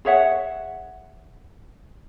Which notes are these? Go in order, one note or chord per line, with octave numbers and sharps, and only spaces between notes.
G#4 C#5 E5 F#5